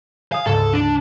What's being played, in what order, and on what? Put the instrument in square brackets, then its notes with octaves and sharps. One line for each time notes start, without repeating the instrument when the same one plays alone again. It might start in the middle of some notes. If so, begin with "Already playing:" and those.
[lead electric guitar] F5 [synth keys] G#5 D#6
[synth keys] D2 G#2 C#3 [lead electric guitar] A4
[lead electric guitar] D4